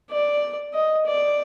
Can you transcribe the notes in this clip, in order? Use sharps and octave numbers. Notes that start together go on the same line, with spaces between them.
D5
D#5
D5